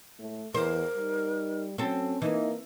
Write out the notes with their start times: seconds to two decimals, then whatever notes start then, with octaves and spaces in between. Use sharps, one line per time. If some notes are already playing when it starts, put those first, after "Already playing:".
0.20 A2 A3
0.54 E2 E3 A#4 C5
0.96 G3 D#4
1.78 F#3 C4 C#4 A4
2.22 E3 A#3 D#4 D#5